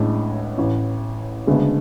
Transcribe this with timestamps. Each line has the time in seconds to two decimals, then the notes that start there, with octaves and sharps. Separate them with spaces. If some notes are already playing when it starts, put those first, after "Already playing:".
Already playing: A1 A2 G#3 D4
0.57 A1 A2 E3
1.47 D2 C#3 G#3 B3 D4